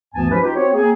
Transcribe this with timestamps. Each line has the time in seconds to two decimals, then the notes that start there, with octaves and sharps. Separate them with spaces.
0.15 D2 G2 E3 B3 G#5 A5
0.30 F3 G#3 C#4 E4 G4 B4
0.42 D#4 F4 G4
0.56 C4 F#4 C5 C#5
0.74 A#3 C4 G#4